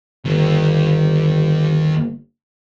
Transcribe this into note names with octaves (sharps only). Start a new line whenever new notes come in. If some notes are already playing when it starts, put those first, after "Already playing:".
G1 D#2